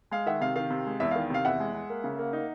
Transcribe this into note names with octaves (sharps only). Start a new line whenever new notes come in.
G#3 F5
D#3 E5 F#5
C3 F5
D#3 F5
C3
G#3
E2 E5
D#3 F5
C3 F5
E2 E5 F#5
G#3
G#3
A#3
C#3
A#3
D#4